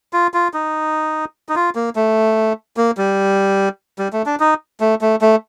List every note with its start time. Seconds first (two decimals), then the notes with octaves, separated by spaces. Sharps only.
0.13 F4
0.34 F4
0.54 D#4
1.49 D#4
1.56 F4
1.75 A#3
1.96 A3
2.77 A#3
2.98 G3
3.99 G3
4.13 A3
4.26 D4
4.40 D#4
4.80 A3
5.01 A3
5.21 A3